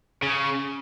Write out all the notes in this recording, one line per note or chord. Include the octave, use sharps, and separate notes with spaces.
C#3